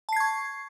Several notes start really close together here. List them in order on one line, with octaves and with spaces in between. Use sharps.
A5 C7 G#6 C#6